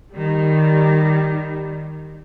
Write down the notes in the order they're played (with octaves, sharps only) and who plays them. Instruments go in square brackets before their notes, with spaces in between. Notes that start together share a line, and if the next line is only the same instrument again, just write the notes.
[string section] D#3 G3